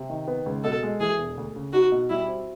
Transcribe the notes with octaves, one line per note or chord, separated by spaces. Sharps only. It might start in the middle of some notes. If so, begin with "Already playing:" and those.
Already playing: C3
D#3
B3
C#2
B2 A4
G#3
E3 G#4
E1
D2
C#3
D#4 F#4
B2
G3 E4
C4